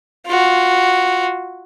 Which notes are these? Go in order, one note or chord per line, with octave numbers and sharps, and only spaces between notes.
F4 F#4